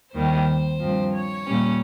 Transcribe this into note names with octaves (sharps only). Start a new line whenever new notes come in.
D#2 D#3 G3 C5
G2 F3 C4
C#5
A#2 G3 C#4